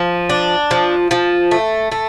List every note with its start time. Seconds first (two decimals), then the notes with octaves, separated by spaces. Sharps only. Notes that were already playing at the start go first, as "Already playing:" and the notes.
Already playing: F3
0.29 D4
0.71 F3
1.11 F3
1.51 A3
1.92 A3